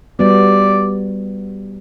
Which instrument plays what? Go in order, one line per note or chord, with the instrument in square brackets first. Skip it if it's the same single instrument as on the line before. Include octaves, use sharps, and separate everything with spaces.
[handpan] G3 B3 F#4 [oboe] D5